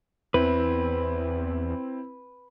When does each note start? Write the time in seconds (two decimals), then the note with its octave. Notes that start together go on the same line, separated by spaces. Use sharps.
0.34 E2 C4 E4 B4